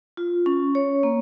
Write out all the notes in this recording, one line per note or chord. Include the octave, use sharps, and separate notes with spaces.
F4
C#4
C#5
A#3